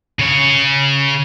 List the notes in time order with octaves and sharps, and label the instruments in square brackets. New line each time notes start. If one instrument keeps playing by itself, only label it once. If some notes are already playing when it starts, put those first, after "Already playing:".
[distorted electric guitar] C#3 C#5